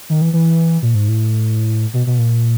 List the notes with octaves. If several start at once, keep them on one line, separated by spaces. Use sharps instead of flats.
D#3
E3
E3
A#2
G#2
A2
B2
B2
A#2